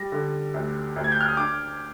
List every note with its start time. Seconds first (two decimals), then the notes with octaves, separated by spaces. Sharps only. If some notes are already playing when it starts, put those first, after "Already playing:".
Already playing: G3 A#6
0.12 D3
0.54 D2
0.96 D2
1.04 G#6
1.12 G6
1.21 F6
1.28 D#6
1.37 D4 D6